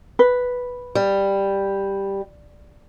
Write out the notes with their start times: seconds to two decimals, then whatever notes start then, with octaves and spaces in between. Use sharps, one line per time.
0.19 B4
0.95 G3